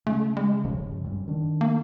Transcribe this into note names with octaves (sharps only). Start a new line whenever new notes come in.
C#3 A3
G#3
E1 G2 C#3 F3
F1 F#2 G3
D#3 D4
A#3